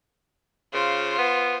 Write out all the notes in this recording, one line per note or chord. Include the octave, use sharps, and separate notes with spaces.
C#3 F4 C5
B3